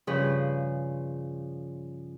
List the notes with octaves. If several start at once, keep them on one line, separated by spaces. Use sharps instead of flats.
G2 C#3 F3 G#4 B4